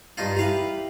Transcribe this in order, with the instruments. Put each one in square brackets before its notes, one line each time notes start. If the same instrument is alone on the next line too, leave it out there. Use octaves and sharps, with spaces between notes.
[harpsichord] G2 D#4 F4
[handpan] E4 G4 [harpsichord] B4 F5 A#5